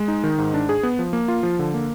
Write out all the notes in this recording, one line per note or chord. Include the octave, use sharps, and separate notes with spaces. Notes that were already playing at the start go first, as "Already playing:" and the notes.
Already playing: G#3
D#4
D#3
G#2
D4
G#4
B3
F3
A#3
F4
F3
D3
A#3